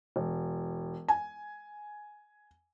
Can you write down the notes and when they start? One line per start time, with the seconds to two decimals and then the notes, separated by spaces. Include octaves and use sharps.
0.16 E1
1.08 G#5